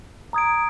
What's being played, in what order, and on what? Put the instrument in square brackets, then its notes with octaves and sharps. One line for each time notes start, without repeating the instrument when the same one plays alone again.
[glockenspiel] A#5 D#6 G#6 D7